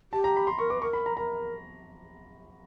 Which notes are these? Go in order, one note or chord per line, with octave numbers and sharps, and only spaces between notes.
G4 A5
A#5
B5
C6
A#4 C#6
B4 D6
A#4 C#6
B5
A#5
A#4 A#5